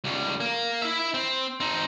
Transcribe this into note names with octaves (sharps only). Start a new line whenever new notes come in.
C#2 G3
A#3
E4 E5
C4
C4 D#4